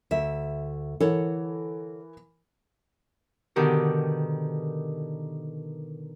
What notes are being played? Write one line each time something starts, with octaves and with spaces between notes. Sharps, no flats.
D2 E5
E3 A4 A#4 C#5 F#5
B2 D3 D#3 G4 A#4